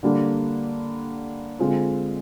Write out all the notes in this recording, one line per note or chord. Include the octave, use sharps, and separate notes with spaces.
D3 G3 A#3 D4
D3 G#3 C4 F4